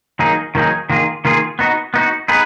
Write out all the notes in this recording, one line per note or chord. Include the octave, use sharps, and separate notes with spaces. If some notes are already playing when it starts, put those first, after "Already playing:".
D#3 F#3 A#3 D#4 G#4
D#3 F#3 A#3 D#4 G#4
D#3 A#3 F4 G#4
D#3 A#3 F4 G#4
B3 D#4 F#4
B3 D#4 F#4
B3 D#4 G#4 B4